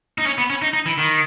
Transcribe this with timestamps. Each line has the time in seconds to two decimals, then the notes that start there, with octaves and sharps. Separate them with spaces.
0.18 D#4
0.26 C#4
0.38 B3
0.50 C#4
0.62 D#4
0.73 D#4
0.86 E3
0.98 D#3